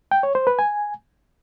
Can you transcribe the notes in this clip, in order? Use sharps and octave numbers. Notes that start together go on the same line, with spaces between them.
G5
C#5
C5
B4
G#5